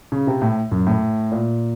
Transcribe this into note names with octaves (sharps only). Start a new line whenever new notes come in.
C#3
C3
A2
F#2
A2
A#2